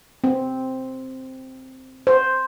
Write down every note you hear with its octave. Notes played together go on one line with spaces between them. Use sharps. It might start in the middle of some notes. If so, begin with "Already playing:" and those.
C4
C5